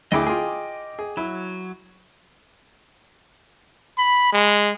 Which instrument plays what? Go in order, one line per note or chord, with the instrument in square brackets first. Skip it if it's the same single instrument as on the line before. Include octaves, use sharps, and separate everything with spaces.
[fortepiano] D2 E4 G#4 [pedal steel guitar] D#5 G5 D6
[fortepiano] F4 G#4
G#4
[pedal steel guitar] F#3 [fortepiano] E4
[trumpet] B5
G#3